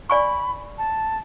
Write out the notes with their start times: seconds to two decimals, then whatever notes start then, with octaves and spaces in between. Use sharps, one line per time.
0.10 D5 G#5 B5 C#6
0.78 A5